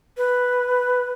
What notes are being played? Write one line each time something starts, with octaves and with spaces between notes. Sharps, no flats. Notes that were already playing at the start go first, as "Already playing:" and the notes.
B4